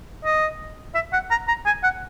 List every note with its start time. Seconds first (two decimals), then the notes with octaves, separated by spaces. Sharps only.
0.25 D#5
0.95 E5
1.13 F#5
1.31 A#5
1.48 A#5
1.66 G#5
1.84 F#5